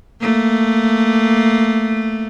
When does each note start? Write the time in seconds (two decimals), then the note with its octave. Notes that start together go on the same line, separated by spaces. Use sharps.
0.20 A3 A#3